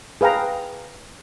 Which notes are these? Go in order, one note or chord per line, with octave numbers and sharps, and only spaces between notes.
G#4 B4 F5 G5 A#5